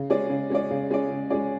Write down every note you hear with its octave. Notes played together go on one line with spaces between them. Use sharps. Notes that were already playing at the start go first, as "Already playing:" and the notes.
Already playing: C#3
G#3 C#4 G#4 D5
C#3
G#3 C#4 G#4 D5
C#3
G#3 C#4 G#4 D5
C#3
G#3 C#4 G#4 D5